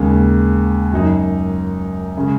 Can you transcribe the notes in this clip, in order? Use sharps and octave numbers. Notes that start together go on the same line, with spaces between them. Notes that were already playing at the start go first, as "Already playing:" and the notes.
Already playing: D#2 C#3 G#3
F#2 F#3 D#4
C#3 G#3